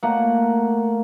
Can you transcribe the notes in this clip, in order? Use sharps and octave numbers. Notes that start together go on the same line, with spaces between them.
A3 A#3 F#5